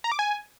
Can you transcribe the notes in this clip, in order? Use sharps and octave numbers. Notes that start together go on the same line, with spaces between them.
A#5
D6
G#5